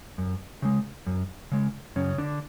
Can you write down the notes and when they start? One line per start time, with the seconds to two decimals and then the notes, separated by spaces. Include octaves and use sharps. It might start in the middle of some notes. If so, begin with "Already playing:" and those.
0.18 F#2
0.62 C#3 G#3
1.06 F#2
1.52 C#3 G#3
1.96 F#2 C#3 C#4
2.18 D3 D4